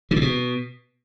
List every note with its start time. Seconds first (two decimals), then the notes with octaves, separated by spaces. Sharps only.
0.11 D3
0.16 C3
0.21 B2